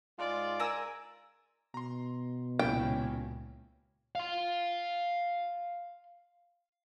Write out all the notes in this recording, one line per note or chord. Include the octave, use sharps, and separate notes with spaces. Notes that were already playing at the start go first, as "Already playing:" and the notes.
G#2 G#3 F4 D5
A#4 G#5 E6
B2 A#5 C6
C#2 A#2 C#3 A#3 C#4 E4 G5
F5 C6